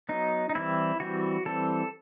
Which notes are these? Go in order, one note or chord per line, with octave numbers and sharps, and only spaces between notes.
F#3 B3 D#4
D#4
E3 G3 C4 E4
E3 G3 C4 F#4
E3 G3 C4 A4